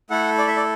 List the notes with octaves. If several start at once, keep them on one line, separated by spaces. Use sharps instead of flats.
A3 E4 A4 F#5
D5
E5
D5